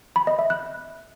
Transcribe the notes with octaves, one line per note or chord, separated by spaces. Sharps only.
B5
D#5
E5
F#6